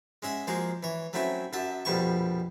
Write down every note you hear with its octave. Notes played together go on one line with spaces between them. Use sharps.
G#3 C#4 E5 F#5
F3 G#3 A#3 F#4 G#4
E3 C#5
F#3 A3 C4 C#4 E4 F#4
F#2 F#3 E5 A5
A#1 F2 B2 G3 A5 C#6